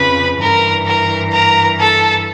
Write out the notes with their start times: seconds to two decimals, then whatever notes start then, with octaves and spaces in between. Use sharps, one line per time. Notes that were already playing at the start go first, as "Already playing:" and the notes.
Already playing: F2 C#3 F3 B4 B5
0.40 G2 E3 A#4 A#5
0.86 A#4 A#5
1.33 A#4 A#5
1.79 A4 A5